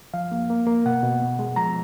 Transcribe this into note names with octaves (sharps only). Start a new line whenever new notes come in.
F3 F5
A#3
A#3
A#3
B2 F#5
B2
B3
G#3
F3 A#5